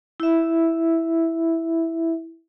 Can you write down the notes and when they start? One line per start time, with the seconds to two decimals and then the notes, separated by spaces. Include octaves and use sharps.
0.20 E4 E5